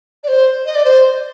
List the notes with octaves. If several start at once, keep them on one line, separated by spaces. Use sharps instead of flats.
D5
C5
D#5
D5
C5